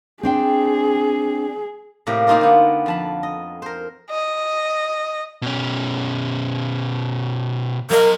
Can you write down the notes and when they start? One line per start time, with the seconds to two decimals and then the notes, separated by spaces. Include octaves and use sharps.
0.23 C4 D4 G#4 G5
2.07 A2 C3 A#3 G4 A#4
2.27 A#3 C4 D#4 F4 A#4
2.41 D3 B3
2.86 F2 A5 B5
3.23 D#5
3.62 A#4 C5
4.10 D#5
5.42 B2 C#4
7.91 F#3 A#4 D#5